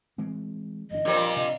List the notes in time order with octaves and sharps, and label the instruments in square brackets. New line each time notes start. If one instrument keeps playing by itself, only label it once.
[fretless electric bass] E3 G#3 C4
[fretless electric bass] G1 E3 D4 [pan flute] D#5
[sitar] A#2 G3 C4 [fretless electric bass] F3 D4
[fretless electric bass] C3 D4